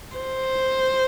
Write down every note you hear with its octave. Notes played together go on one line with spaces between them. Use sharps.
C5